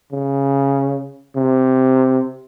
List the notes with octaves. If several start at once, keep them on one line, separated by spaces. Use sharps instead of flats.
C#3
C3